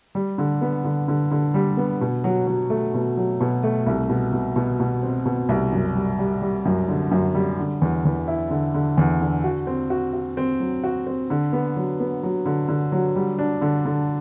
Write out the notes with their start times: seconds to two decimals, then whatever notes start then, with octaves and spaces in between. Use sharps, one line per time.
0.15 G3
0.38 D3
0.61 B3
0.84 D3
1.08 D3
1.31 D3
1.54 G3
1.77 B3
2.01 B2
2.24 F#3
2.47 F#3
2.70 A3
2.94 B2
3.17 F#3
3.40 B2
3.63 A3
3.86 C2
4.09 B2
4.33 B2
4.56 B2
4.80 B2
5.03 C4
5.25 B2
5.49 C2
5.72 F#2
5.95 G3
6.19 G3
6.42 G3
6.65 F#2
6.89 D3
7.11 F#2
7.35 G3
7.59 D3
7.82 E2
8.05 E2
8.28 E4
8.50 D3
8.74 D3
8.97 E2
9.21 D3
9.44 F#4
9.67 C4
9.90 F#4
10.13 F#4
10.37 C4
10.60 F#3
10.84 F#4
11.06 C4
11.30 D3
11.53 B3
11.76 F#3
12.00 B3
12.23 F#3
12.46 D3
12.69 D3
12.92 F#3
13.16 G3
13.39 D4
13.61 D3
13.86 D3